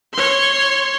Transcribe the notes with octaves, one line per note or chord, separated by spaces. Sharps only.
C#5 C6